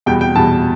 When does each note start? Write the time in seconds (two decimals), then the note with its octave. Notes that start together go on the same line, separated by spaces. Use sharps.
0.06 E2 B2 G3 G5
0.21 G5
0.35 E2 B2 G3 A5